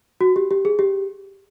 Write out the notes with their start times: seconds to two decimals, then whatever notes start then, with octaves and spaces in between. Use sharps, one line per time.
0.21 F#4
0.36 G4
0.51 G4
0.65 G#4
0.79 G4